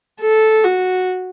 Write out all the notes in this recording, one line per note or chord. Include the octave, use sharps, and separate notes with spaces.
A4
F#4